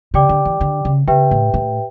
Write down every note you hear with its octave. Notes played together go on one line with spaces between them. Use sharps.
C#3 G4 D5 G5 D6
D3
E3
D3
C#3
C#3 G4 B4 E5 G5
A2
A2